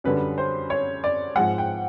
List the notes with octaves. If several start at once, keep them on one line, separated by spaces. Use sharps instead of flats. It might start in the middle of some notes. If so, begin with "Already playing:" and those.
F#2 D3 G3 B4
C5
C#5
D5
G#2 F3 G#3 F#5
G5